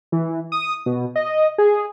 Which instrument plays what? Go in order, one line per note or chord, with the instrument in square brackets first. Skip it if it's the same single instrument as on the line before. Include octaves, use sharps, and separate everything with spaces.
[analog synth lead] E3
D#6
B2
D#5
G#4